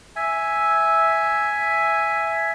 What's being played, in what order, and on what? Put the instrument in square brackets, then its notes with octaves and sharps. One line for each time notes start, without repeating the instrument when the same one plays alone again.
[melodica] E5 G#5